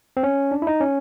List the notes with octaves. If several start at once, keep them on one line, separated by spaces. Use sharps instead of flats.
C4
C#4
D4
E4
D#4
C#4